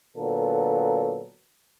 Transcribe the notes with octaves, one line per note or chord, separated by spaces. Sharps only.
A#2 D3 F#3 B3 A4